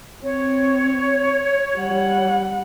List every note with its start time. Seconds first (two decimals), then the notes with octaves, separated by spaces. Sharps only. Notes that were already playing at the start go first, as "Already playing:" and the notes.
0.23 C4 C#5
1.77 G3 F#5